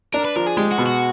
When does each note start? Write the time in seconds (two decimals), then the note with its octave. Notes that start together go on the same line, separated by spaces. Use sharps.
0.14 D4 A#4
0.25 B4
0.36 F3 A#4
0.46 G#4
0.57 G#3 G4
0.71 F#4
0.78 B2
0.86 F#4